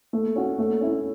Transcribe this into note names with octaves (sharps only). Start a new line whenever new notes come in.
A3
C#4 F#4
A3
C#4 E4